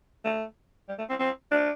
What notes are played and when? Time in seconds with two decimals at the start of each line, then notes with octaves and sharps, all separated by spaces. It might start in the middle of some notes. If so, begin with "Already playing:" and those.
0.25 A3
0.89 G3
0.99 A3
1.10 C4
1.20 C4
1.51 D4